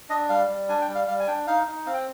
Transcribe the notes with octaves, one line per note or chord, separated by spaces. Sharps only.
D4 D#5
G3 F5
G3
D4 G#5
G5
G3
F5
G3 F5
G#5
D4 G5
D#4 F5
D#4
C4 F5
G5